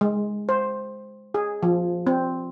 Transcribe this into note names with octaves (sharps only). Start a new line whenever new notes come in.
G#3
C5
G#4
F3
C4